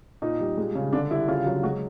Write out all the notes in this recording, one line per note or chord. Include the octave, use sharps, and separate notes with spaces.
A#2 D#4
G3
G#3
C#3
D3 D4
G3 E4
C#3 F4
F#3
G#3 F#4